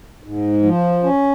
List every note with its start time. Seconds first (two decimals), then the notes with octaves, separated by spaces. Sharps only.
0.24 G#2
0.63 F3
1.03 C#4